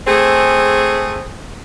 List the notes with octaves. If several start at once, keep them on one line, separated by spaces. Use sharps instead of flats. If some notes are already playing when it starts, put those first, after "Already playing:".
A3 C4 G#4